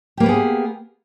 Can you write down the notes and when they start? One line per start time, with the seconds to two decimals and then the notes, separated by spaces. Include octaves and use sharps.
0.17 G4
0.20 A#3
0.23 B4
0.26 B3
0.29 G#4